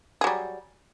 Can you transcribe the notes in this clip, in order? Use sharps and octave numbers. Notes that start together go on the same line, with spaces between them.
F#3 G3 G#4